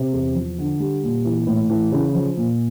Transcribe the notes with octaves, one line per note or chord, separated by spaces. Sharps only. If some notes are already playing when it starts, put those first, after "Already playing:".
Already playing: C3
E2
F3
D3
G3
A#2
E3
A2
E3
C#3
F3
A#2